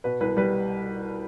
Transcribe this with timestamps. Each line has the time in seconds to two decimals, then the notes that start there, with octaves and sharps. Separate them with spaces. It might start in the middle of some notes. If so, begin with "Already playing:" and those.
0.04 B2 B4
0.21 C2 B4
0.37 G3 B4